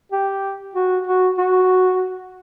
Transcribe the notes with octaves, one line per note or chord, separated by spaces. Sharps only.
G4
F#4
F#4
F#4